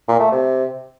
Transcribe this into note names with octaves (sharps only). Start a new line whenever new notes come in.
A#2
A3
C3